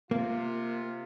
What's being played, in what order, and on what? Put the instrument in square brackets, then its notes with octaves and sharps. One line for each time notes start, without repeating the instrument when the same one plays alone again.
[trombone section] C3 F4 [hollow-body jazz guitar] A#3